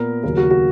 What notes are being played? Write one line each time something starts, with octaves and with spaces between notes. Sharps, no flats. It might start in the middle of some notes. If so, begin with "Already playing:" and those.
Already playing: A#2 B3 A#4
D#2 C#3 F#3 A#4
F#4
F#4